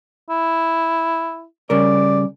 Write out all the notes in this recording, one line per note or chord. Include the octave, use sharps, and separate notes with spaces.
E4
C#3 G3 A#4 D5